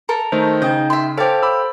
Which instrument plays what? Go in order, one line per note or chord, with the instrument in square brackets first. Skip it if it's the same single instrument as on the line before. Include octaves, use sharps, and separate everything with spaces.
[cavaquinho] A4 A#4
[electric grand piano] D#3 A3 D#4 [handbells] C5
[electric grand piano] C#3 [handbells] D#4 G5 G6 [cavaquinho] D#5
[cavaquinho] E5 C6
[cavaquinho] G4 F5 [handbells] A4 C5 [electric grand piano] C#5 A5 A6
[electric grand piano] B5 D6 E6